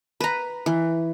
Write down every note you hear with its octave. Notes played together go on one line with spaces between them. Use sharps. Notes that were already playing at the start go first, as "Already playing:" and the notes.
B4 A#5
E3